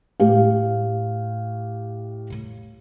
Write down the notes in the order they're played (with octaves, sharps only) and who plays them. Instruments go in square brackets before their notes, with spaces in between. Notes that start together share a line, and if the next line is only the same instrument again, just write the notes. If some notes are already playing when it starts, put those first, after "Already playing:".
[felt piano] A2 G4 F5